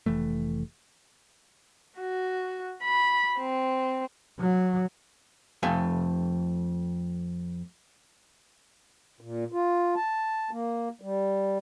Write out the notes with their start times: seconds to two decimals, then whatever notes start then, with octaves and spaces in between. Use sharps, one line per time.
0.06 F1 E3 A3
1.99 F#4
2.83 B5
3.38 C4
4.40 F#3
5.63 F2 A3 G#5
9.21 A#2
9.52 F4
9.96 A5
10.51 A#3
11.01 G3